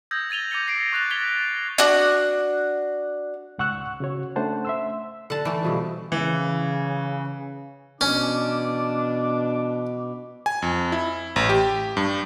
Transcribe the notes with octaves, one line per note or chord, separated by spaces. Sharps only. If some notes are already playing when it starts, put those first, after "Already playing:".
D#6 E6 G6 G#6 A#6
G#6 A6 D#7 F7 G7
D6 G6 A6 A#6 C#7 G7
C7 D7
C#6 F#6 A6 F7
G#6 A6 B6 F7 G7
D4 F#4
C#2 G#2 F#5 C#6 E6 F#6
C#3 F#4 C#5
A3 C#4 D4 C5 F#5 A5
E5 C6 E6
D3 F#5 A5
E3 A3
G2 B2 F3
C#3 E3
B2 E3 C#4 D4 D6
G#5
F2
E4
A1
G4
G2